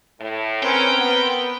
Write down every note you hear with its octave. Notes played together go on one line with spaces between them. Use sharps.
A2
C4 C#4 A#4 B4 G5
B3